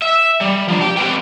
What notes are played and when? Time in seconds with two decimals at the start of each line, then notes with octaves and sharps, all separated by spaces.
0.02 E5
0.41 G3
0.68 F3 D4
0.81 G4
0.97 C4 G4 B4 G5